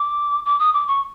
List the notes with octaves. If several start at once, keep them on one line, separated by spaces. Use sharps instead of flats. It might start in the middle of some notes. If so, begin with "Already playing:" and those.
Already playing: D6
D6
D#6
D6
C#6